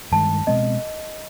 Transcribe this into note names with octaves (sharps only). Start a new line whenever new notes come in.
G2 D#3 G#3 A5
B2 G#3 C4 D#5